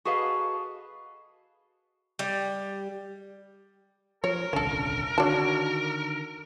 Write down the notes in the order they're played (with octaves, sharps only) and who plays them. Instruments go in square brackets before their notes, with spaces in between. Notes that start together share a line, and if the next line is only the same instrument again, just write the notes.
[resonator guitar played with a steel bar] F#4 G#4 A4 B4 D#5 F5
[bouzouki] G3
[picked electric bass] F3 [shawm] A#4 [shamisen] C#5
[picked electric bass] D#1 C2 D3 [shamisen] C#4 A4
[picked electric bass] D3 D#3 [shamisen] D4 A5 [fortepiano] F#4 C#5